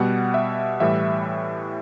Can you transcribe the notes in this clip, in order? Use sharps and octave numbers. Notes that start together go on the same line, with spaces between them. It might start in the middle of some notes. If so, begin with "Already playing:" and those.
Already playing: B2 G3 F#5
E5
A2 E3 G3 E5